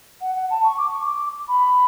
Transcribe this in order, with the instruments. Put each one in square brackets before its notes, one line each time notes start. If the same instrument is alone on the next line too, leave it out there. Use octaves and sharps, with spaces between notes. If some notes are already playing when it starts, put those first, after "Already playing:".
[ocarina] F#5
F#5
A5
C#6
D6
C#6
D6
B5